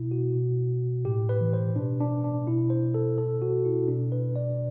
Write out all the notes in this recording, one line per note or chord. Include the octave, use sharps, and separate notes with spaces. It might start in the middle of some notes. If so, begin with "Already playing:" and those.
Already playing: B2 E4
F#4
B2
A2 G4
B4
E3
C5
B2 D4
D4
D4
B2 E4
C5
A4
B2 A4
F#4
E4
B2 D4
B4
D5